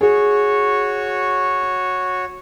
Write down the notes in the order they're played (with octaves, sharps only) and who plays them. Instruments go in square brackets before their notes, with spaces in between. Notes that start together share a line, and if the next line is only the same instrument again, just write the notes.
[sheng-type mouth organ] F#4 C#5 [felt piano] G#4